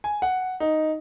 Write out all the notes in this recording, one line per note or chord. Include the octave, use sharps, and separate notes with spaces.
G#5
F#5
D#4